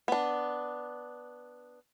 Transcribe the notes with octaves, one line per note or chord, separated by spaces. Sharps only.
B3 D4